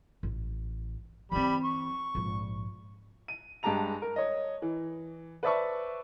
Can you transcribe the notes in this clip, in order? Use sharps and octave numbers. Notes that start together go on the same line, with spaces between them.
A1
E3 G3 C4 B5
C#6
A#1 G#2
D#7
G2 G#3 G4 A5 A#5 F7
A#4
C#5 D#5
E3
B4 C5 D5 E5 A5 C#6